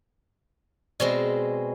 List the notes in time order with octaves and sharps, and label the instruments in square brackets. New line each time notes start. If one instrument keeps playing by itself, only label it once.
[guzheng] B2 G#3 C4 [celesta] C5 D5